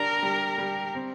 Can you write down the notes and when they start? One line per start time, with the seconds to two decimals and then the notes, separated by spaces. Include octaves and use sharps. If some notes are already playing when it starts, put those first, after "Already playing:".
Already playing: G3 D4 A#4
0.23 G3
0.58 G3
0.95 C4